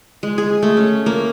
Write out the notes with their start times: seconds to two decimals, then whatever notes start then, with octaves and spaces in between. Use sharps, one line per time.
0.23 G#3
0.38 G#4
0.63 A3
0.77 C#4
1.06 A#3